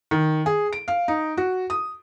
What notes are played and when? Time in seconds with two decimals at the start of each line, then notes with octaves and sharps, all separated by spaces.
0.11 D#3
0.46 G#4
0.73 D7
0.88 F5
1.08 D#4
1.37 F#4
1.70 D#6